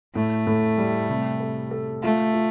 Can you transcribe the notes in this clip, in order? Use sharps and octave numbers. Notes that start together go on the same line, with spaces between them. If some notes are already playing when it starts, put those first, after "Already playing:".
A2 A3
A2
G3
C3
A4
A4
A3 F4
F4